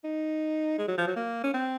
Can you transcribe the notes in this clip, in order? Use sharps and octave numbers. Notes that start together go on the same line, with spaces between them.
D#4
G#3
F#3
F3
F#3
A#3
C#4
C4